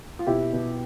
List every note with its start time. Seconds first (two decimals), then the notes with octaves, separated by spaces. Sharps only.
0.19 F4
0.27 B2 E4 G4
0.53 B2